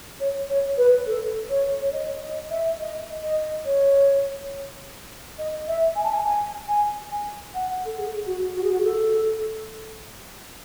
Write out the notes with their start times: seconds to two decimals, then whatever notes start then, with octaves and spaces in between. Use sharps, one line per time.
0.20 C#5
0.49 C#5
0.78 B4
1.07 A4
1.50 C#5
1.81 C#5
1.93 D#5
2.22 D#5
2.50 E5
2.79 D#5
3.23 D#5
3.66 C#5
5.38 D#5
5.68 E5
5.96 G#5
6.04 A5
6.12 G#5
6.25 G#5
6.68 G#5
7.11 G#5
7.55 F#5
7.85 A4
7.98 G#4
8.27 F#4
8.55 F#4
8.64 G#4
8.73 F#4
8.84 A4